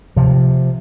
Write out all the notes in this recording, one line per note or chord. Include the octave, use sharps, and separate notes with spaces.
C3 F3